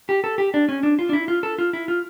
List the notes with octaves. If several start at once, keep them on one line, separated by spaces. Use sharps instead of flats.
G4
A4
G4
D4
C#4
D4
F4
D4
E4
F4
A4
F4
E4
F4